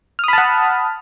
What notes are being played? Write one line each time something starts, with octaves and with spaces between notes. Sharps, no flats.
F#5 A5 B5 D#6 F6